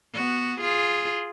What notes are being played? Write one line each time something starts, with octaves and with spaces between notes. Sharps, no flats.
B3 F#4
F4 G#4